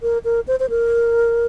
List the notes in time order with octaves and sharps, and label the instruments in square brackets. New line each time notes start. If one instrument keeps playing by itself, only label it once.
[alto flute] A#4
A#4
C5
C5
A#4